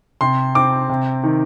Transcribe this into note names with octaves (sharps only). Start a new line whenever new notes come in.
C3 C6
C4 D6
C3
D#3